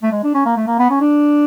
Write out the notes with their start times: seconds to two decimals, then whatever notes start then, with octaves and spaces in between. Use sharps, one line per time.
0.03 A3
0.12 G#3
0.24 D4
0.34 C#4
0.46 A#3
0.56 A3
0.67 A#3
0.79 B3
0.90 C#4
1.01 D4